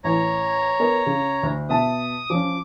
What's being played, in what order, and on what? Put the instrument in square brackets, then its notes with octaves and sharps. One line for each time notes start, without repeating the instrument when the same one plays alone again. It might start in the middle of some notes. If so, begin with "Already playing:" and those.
[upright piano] A1 [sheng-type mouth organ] C#5 A#5
[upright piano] B3 A#4 D#5
C#3
D2
[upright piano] B2 E5 A5 [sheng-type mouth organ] D#6
[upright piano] F3 C#4 [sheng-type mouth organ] D6